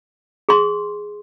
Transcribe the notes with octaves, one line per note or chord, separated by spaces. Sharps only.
G#4 C6